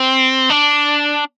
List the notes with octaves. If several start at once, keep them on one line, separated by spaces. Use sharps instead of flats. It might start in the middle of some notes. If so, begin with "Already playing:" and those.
Already playing: C4
D4